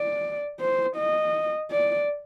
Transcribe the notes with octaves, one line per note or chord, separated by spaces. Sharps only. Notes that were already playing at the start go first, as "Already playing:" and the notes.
Already playing: D5
C5
D#5
D5